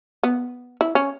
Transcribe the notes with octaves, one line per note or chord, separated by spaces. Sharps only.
B3
E4
C#4